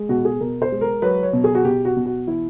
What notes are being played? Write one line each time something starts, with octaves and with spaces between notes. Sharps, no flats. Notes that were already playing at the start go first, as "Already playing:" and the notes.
Already playing: G#3
B2 F#4
G#4
B2 A#4
C5
G#3
A#4
F#3 B4
C#5
B2
G#4
F#4
B2 G4
F#4
B2
F#4
E3 E4